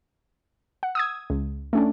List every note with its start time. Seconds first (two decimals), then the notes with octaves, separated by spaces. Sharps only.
0.83 F#5
0.95 D#6 E6 G#6
1.30 C#2
1.73 A3 C#4 D4